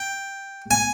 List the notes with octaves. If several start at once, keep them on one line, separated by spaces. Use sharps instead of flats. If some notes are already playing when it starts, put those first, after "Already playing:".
Already playing: G5
G#5